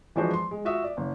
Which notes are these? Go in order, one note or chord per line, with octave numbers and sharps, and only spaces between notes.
E3 F3 G#3 D4 F#4 C5
C6
G#3
F4 F#4 E5 D#6
D5
F#1